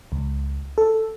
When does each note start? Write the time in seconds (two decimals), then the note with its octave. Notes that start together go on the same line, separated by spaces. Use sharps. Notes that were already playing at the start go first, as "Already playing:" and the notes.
0.12 C#2
0.78 A4